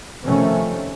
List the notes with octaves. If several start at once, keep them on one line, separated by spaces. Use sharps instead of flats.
C3 D#3 F3 A3 C#4